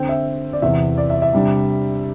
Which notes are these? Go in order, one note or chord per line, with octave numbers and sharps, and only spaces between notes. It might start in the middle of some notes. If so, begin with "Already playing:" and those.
Already playing: D3 C4 G5
E5
D5
E2 C3 E3 E5
D5
E5
E5
C3 G3 D4